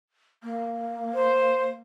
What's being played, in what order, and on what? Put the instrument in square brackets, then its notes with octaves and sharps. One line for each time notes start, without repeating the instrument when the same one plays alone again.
[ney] A#3
[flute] C5